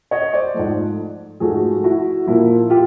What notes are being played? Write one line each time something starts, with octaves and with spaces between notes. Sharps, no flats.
C#5 D#5
C5 D5
G#2 F3 A3
G#2 F3 A3 F#4 G#4
E4 F#4
A#2 F3 A#3 E4
F4 G4